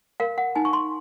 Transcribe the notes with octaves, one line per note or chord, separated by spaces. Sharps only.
A#4 F5
F#5
D#4 G#5
C#6
C6